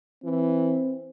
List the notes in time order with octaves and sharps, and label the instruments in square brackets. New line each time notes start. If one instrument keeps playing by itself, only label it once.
[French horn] E3 [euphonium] C4